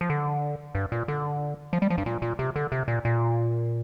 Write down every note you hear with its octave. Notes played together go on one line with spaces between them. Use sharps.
F3
D3
G2
A#2
D3
F3
G3
F3
G2
A#2
A#2
C3
D3
C3
A#2
A#2